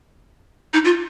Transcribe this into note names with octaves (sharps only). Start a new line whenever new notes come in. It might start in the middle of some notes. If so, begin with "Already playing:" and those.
D#4
F4